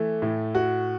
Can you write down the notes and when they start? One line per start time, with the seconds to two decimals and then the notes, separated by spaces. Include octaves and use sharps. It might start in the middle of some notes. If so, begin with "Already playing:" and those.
Already playing: E3 A3
0.22 A2
0.55 F#4